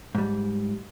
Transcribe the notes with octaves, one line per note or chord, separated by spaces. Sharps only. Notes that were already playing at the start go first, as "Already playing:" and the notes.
G#2 G3